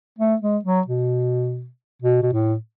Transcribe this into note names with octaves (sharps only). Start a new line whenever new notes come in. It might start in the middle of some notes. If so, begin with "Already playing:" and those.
A3
G#3
F#3
B2
B2
B2
A2